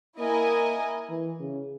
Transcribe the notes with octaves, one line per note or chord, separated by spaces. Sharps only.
A#3 E4 A#4 D#5 G#5
E3
C#3